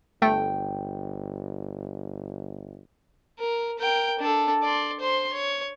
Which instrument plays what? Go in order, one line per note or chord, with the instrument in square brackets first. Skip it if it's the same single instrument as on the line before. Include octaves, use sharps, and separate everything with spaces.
[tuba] G1 [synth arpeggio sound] A3 [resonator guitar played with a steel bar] G5
[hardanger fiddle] A#4
A#4 G5
D4 A4
D5 C6
C5 C6
C#5